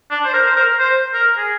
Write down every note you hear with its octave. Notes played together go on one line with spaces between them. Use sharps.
D4
C5
A#4
C5
A#4
C5
A#4
G#4